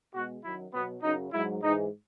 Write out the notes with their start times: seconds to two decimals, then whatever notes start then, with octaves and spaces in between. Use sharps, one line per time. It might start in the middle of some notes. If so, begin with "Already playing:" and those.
0.13 B2 G#3 F#4
0.43 F#2 D#3 F#3 E4
0.73 B2 F#3 B3
1.02 F#2 C#3 F#3 D#4
1.32 G#2 F#3 E4
1.62 G#2 E3 G#3 D#4